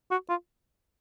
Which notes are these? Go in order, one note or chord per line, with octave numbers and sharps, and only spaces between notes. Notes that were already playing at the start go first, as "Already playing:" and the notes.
F#4
F4